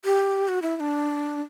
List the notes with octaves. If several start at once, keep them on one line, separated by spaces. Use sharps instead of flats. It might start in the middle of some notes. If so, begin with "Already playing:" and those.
G4
F#4
E4
E4
D4